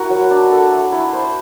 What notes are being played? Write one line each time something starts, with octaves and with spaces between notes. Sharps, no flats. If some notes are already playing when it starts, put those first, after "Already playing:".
Already playing: E4 F#4 A#4
F#3
D4
A4
A3
E4
C5